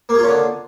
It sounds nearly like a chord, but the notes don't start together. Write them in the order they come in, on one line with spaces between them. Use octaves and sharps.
A#3 G#4 F4 C#4 D3